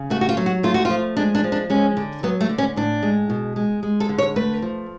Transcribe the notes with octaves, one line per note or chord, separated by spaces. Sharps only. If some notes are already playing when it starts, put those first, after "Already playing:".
Already playing: C#3
A3 F#4
F#4
F4
F#3
F#4
A3 F4
F#4
F4
F3
G#3 D4
D4
F3
D4
G#3 C#4
D3
F#3 B3
A3
D3
C#4
A2 D4
G#3
B2
G#3
G#3
A4
D3
C#5
A3 B4
F3